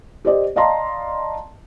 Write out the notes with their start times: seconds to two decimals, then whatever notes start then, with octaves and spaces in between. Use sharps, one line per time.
0.25 G4 C5 D5 D#5
0.56 D5 D#5 F5 A5 A#5 C6